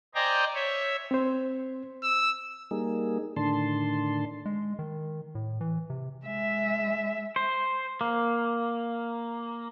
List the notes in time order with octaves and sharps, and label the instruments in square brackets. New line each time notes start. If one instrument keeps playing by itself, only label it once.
[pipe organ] C5 D5 D#5 G5 G#5 A#5
C#5 E5
[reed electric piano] C4 C5
[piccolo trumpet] E6
[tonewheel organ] G3 A#3 D#4 G#4
A2 D3 D#3 D4 A5 C6
[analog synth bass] G#3
D#3
A2
E3
C3
[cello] G#3 E5
[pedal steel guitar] C5
A#3